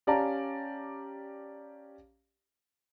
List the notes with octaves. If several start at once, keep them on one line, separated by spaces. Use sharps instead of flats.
C#4 G4 D5 F5 A5 A#5